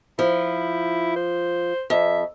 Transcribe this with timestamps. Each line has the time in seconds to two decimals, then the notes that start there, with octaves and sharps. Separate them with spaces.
0.19 F3 E4
1.16 C5
1.90 F2 E5